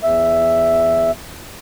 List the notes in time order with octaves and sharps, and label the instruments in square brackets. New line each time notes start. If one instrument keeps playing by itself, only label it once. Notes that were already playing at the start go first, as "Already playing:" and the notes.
[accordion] E2 E5